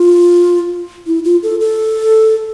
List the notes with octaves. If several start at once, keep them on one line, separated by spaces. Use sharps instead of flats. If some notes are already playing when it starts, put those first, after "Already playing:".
Already playing: F4
E4
F4
A4
A4